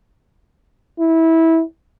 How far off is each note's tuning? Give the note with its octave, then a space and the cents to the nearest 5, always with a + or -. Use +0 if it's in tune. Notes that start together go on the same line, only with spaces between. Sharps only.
E4 -20